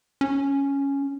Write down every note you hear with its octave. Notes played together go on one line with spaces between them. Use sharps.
C#4